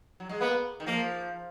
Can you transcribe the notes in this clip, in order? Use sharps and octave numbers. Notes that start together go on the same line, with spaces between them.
F#3
G#3
A#3 B3
D#3
F3 A#3